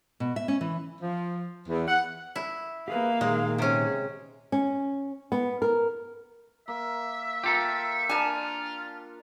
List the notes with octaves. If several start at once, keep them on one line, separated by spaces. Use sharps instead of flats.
B2
E5
C#4
E3
F3
E2
F#5
E4
A#3 G4 G#4 B4 F5
A#2 D#3 G#3 G4
C3 C#4 G#4
C#4
B3
A#4
A#3 E5
F4 G4 A4 A#4
D4 F4 A#4 D5 G#5 A5